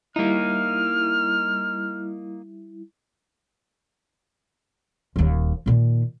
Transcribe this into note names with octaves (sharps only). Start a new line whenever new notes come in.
G3 A#3 D#4 E4 F6
D#1 D#2
A#2 D#3